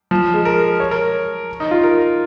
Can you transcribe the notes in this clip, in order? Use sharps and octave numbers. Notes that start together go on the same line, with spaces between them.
F3
G#3
A#4
C#5
A#4
D#4
F4
A#4